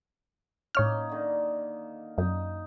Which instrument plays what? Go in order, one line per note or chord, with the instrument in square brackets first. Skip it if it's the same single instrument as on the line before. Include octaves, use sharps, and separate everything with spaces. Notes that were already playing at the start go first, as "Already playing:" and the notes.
[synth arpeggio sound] A2 C#5 F6 [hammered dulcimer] A#3 C#4 D#4
[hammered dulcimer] D3 D#3
[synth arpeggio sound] F#2 [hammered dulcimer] D#4